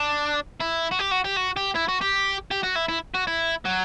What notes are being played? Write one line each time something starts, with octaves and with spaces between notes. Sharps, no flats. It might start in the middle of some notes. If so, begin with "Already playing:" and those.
Already playing: D4
E4
F#4
G4
F#4
G4
F#4
G4
E4
F#4
G4
G4
F#4
E4
E4
F#4
E4
F#3